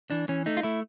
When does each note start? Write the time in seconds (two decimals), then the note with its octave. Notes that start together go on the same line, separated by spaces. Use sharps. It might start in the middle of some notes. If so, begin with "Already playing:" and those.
0.10 E3 D4
0.29 E3 C#4
0.46 A3 D#4
0.57 F4
0.63 A3 E4